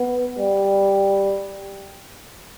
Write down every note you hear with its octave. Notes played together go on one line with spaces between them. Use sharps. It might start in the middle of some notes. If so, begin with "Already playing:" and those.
Already playing: B3
G3